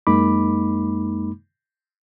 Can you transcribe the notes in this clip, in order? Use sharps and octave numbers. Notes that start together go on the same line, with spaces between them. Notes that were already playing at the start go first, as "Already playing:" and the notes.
F#2 G#3 A#3 D#4 B5 D6